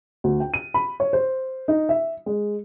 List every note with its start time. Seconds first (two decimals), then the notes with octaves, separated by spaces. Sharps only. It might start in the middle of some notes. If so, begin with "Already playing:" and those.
0.24 D2
0.40 G5
0.54 D#7
0.74 B5
1.00 C#5
1.13 C5
1.68 D#4
1.89 E5
2.26 G#3